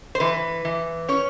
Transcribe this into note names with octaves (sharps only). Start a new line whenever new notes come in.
C5
E3 B4
E3
C#4 C#5